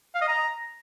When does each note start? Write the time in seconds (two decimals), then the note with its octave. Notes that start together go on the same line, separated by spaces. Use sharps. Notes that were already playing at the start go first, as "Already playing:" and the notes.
0.15 F5
0.21 D#5
0.28 A#5